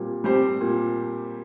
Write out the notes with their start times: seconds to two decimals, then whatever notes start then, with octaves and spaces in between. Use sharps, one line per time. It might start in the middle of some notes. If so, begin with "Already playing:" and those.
Already playing: A#2 G3 C4
0.24 G3 C4 G4 C5
0.61 A#2